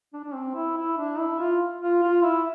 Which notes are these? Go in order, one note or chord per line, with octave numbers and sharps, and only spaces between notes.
D4
D4
C4
E4
E4
D4
E4
F4
F4
F4
E4